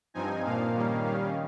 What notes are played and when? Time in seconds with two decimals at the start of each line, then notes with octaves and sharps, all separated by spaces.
0.14 G2 F3 C4 D#4 G#5
0.44 A#2 F3 A#3 F5
0.74 D#3 G3 A#3 C#4
1.05 D#3 G3 C#4